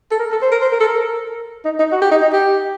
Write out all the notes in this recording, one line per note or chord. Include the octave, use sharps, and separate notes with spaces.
A4
A#4
A4
C5
A#4
C5
A#4
A4
A#4
D#4
D#4
F#4
G4
D#4
D#4
G4